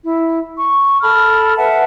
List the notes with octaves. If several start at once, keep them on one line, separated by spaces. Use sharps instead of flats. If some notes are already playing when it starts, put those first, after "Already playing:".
E4
C#6
A4 A5 B5 F6
B4 E5 F#5 A5